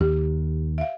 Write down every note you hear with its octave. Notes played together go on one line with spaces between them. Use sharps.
D#2 G4
E5 F5